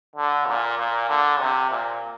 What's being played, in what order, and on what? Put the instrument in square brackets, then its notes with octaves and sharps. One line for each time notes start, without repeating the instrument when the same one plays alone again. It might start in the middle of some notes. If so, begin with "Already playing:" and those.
[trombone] D3
A#2
A#2
D3
C3
A#2